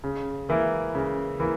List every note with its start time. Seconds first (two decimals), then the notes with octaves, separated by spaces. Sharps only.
0.04 C#3
0.49 E3 A#3 E4
0.95 C#3
1.40 E3 A#3 E4